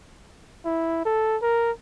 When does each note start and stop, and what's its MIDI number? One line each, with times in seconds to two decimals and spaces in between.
0.65 1.02 64
1.05 1.37 69
1.42 1.71 70